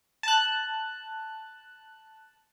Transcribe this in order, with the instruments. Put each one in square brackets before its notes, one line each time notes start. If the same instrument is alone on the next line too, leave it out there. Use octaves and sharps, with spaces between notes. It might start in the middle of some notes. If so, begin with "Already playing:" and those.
[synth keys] A5 F#6